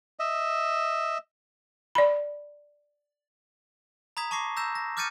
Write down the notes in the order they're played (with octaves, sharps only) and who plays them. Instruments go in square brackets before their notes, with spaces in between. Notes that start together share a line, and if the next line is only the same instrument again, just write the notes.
[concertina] D#5 E5
[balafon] D5 B5
[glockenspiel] A#5 B5 D#6 G#6 B6
A5 C#6 D6 A#6 C7
A#5 E6 G6 A#6 E7
A#6
D6 F6 G6 A6 C#7 D#7